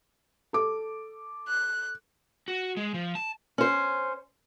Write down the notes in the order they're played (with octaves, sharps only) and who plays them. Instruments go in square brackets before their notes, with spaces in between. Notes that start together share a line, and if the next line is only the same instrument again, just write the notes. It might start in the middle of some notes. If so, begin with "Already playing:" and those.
[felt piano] A4 D6
[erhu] F#6
[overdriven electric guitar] F#4
G#3
F3
A5
[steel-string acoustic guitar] C#4 C5